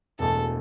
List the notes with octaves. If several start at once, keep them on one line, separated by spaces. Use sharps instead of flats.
E1 E2 B2 A3 A4